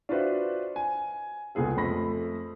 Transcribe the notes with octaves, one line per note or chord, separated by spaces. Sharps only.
D4 F4 F#4 B4 C5 E5
G#5
C#2 A#2 B3 G#4 A4
F2 A3 B5 A#6